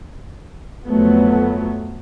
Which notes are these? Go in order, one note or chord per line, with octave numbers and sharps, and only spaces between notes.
F2 F#3 A3 B3